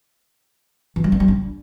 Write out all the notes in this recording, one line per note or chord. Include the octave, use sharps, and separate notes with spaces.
E3
G3
D4
G3
D4